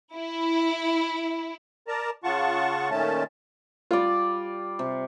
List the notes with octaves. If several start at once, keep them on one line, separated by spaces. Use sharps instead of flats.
E4
A#4 D5 A5 A#5
C#3 F4 F#5 A5 C#6
A#2 D#3 A3 C#4 A5
G3 F4 D5
C3